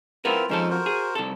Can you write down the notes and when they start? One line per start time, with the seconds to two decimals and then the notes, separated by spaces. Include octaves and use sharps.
0.25 C4 E4 F4 A#4 B4 F#5
0.49 F2 F3 G#3 C#4 D#4 A4
0.70 F#4 A#4 C5
0.86 G#4
1.15 C2 A4